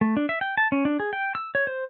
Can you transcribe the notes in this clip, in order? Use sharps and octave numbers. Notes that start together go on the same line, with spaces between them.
A3
D4
E5
G5
A5
C#4
D4
G#4
G5
E6
C#5
C5